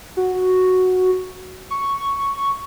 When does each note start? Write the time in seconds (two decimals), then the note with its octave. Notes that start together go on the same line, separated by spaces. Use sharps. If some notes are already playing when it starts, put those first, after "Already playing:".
0.17 F#4
1.71 C#6